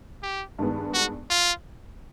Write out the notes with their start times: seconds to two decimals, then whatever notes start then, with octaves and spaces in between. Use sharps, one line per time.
0.23 G4
0.59 G2 D#3 G#3 B3
0.94 F#4
1.30 F4